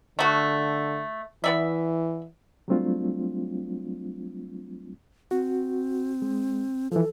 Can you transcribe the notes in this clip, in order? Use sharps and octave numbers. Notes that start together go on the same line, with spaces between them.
D3 A3 F#4
E3 B3 D5 E5
F#3 G3 A3 C4 D4 F4
C4 F#4
G#3
E3 F3 A4